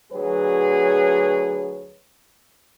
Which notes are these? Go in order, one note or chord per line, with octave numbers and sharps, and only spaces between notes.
D2 F#3 G#4 B4 C#5